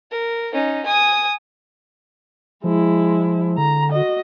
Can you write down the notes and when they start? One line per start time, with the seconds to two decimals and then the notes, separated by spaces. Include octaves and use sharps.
0.11 A#4
0.53 C#4 D#4
0.86 G#5 D#6
2.64 F3 G#3 E4
3.58 D3 A#5
3.92 F#4 D#5